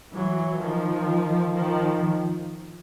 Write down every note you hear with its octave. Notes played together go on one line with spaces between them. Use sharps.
E3 F#3
D#3 F3
D#3 F3